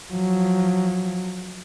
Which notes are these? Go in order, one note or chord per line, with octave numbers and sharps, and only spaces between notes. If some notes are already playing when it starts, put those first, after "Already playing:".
F3 F#3